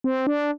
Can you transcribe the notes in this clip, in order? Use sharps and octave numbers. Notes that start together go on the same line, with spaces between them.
C4
D4